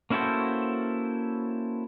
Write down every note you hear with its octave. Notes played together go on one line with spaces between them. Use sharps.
A#3 C#4 E4 F#4 A4 C5